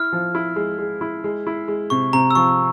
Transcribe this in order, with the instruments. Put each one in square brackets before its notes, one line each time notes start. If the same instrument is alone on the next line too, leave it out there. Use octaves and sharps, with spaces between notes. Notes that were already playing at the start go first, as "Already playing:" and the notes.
Already playing: [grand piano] E4 [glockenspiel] F6
[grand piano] F3
E4
G#3
G#3
E4
G#3
E4
G#3
[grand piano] C3 [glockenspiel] C#6
[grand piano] C3 [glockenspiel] A#5
[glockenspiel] E6
[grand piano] F3 [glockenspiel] C#6